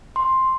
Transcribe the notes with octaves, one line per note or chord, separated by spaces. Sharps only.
C6